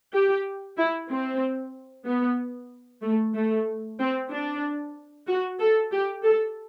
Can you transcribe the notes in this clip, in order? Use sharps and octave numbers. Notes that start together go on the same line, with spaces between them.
G4
E4
C4
B3
A3
A3
C4
D4
F#4
A4
G4
A4